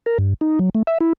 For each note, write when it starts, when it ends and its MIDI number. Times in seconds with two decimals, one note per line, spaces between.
0.06 0.18 70
0.18 0.34 43
0.41 0.59 63
0.59 0.69 54
0.75 0.83 57
0.87 0.98 76
1.01 1.13 64